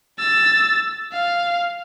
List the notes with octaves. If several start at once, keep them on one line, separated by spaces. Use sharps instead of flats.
E6 A6
F5